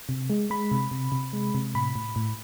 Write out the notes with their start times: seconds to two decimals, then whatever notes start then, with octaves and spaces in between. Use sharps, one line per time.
0.09 C3
0.30 G#3
0.50 G#3 B5
0.71 C3
0.91 C3
1.12 C3
1.33 G#3
1.55 C3
1.75 A2 B5
1.95 A2
2.16 A2